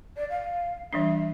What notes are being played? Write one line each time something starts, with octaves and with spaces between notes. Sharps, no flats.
D5
F5
E3 G3 D4 E5